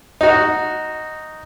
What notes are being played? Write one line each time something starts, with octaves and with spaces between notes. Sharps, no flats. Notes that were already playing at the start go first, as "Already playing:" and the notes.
D#4 F#4